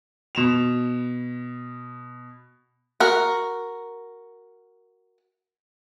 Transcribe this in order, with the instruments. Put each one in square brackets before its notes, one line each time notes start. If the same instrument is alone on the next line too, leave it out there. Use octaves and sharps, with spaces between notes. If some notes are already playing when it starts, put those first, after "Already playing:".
[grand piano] B2 E7 F7
[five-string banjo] F#4 A#4